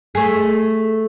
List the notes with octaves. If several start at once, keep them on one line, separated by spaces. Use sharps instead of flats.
A3 G#4